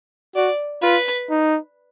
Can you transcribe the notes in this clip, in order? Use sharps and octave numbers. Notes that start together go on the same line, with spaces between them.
F#4 D5
F4 B4
D#4